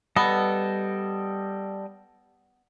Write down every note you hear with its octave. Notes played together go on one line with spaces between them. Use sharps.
G3 B3 A4 D#5